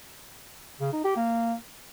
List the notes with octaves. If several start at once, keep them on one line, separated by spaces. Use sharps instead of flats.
C#3
D#4
G4
A#3